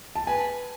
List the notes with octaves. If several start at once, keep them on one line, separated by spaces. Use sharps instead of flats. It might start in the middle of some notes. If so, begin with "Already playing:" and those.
A5
B4 G#5